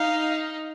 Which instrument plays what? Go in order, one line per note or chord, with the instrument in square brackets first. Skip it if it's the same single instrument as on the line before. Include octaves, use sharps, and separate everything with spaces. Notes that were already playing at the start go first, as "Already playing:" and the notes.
Already playing: [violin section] D#4 [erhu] F5